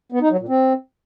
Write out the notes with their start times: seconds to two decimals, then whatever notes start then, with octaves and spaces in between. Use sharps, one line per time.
0.12 B3
0.21 D#4
0.30 F#3
0.40 A#2
0.49 C4